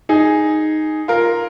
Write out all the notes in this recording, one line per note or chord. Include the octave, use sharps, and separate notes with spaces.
D#4 G#4
F4 A#4